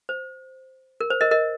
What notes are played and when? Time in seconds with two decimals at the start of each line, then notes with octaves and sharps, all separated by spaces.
0.09 C5
1.01 A#4
1.10 C5
1.21 A#4 D#5
1.31 A#4 D#5